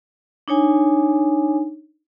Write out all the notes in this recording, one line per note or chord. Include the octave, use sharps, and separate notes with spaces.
D4 D#4 C#5 G#5